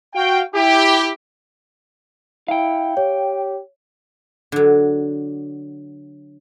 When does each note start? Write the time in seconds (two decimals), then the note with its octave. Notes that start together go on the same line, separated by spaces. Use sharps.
0.15 F#4 F5 G5
0.55 E4 G4
2.48 E4 F5 G5
2.97 G4 C#5
4.52 D3 F#3